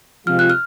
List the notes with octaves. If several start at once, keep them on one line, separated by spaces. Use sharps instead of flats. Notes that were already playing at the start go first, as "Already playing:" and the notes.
C3 F3 G#3 C4 F4 F6
F#6
F6